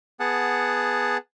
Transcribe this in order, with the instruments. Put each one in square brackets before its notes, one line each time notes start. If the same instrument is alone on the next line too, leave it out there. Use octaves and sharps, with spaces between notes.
[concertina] B3 G#4 F#5 A5